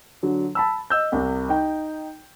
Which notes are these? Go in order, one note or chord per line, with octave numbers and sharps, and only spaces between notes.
D3 F#3
A5 B5 E6
D#5 E6 G6
C2 C3
D#4 G5